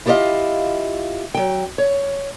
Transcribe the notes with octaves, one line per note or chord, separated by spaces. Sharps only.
E4 F4 G4 A4 D#5 F5
F#3 G5
C#5